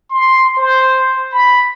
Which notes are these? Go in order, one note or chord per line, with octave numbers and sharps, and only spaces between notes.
C6
C5
B5